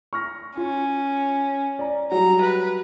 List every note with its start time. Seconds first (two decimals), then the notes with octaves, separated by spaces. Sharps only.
0.13 C#6 F6 A#6
0.57 C#4 F4
1.79 D5 A#5
2.12 F#3 G3 A#5
2.41 B4